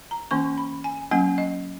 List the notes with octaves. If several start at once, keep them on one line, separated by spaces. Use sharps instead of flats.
A#5
E3 A#3 C#4 C#6
B5
G#5
F#3 A#3 C#4 F#5
D#5